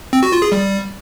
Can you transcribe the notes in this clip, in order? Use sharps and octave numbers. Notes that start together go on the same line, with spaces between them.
C4
F#4
F4
G#4
G3